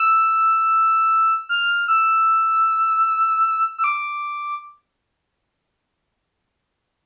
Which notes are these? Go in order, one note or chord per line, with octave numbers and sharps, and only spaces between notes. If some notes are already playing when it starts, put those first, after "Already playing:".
Already playing: E6
F6
E6
E6
D6